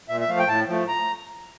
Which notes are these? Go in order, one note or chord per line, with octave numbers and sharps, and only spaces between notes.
A#2 E5
E5
F3 A3 F5
G5
A2 A5
F3 A3
A#5